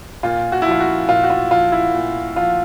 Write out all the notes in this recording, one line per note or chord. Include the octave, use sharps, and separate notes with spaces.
A#2 F4
F#4
E4
F3 F4
F#4
A#2 F4
F#4
F4
F3 F4
E4
A#2
F3 F4